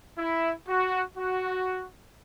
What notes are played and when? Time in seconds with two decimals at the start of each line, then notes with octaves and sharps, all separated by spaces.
0.18 E4
0.68 F#4
1.17 F#4